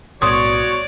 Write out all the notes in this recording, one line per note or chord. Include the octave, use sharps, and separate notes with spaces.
B1 A2 B3 F#4 C#5 D5 C6 D#6